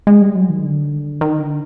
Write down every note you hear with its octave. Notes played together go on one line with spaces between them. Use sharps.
G#3
G3
F#3
D#3
D3
D#3
D3